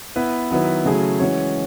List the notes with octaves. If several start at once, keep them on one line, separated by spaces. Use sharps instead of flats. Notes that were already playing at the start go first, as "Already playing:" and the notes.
B3 E4 B4
D#3 F#3 B3 E4 B4
C#3 F#3 A3 E4 G#4
E3 G#3 C#4 F#4 C#5